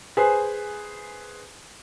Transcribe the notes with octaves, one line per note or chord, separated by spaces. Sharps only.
G#4 B4 C5 G#5